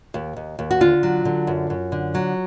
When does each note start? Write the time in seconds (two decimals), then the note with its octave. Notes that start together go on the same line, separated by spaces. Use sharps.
0.14 D#2
0.36 D#2
0.59 D#2
0.71 F#4
0.81 D3 F4
1.03 F#3
1.25 D3
1.47 F#2
1.70 F#2
1.92 D3
2.15 F#3